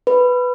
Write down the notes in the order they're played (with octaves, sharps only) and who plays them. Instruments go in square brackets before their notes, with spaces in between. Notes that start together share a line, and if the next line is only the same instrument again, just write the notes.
[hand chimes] B4